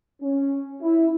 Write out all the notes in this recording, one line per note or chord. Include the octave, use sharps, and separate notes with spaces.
C#4
E4